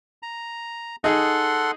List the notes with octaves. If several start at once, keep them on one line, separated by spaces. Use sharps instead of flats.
A#5
D#4 G#4 A4 F#5 C6